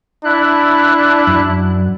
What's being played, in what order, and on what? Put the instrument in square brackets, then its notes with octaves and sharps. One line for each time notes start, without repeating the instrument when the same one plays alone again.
[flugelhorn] D4 [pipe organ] E4 F#6
[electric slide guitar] F#2